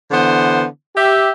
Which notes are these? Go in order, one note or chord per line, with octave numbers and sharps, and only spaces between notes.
D3 E3 B3 C5
G4 E5